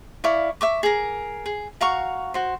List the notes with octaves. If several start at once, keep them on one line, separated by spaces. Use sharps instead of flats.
E4 D5 F5 C#6
E5 C#6 D6
G#4 A#4
G#4
F#4 F5 A#5 C#6
F#4 C5